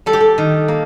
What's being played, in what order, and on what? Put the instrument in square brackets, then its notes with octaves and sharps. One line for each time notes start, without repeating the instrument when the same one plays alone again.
[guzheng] G3 A4
G4
A4
D#3
A#3